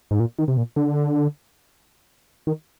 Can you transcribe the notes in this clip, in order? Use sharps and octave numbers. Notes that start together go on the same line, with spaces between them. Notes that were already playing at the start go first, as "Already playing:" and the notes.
G#2
A#2
D#3
C3
A#2
D3
D#3